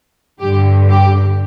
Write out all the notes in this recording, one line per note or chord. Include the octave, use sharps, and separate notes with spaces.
G2 D3 G4
G4